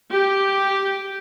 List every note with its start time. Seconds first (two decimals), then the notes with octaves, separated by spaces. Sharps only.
0.10 G4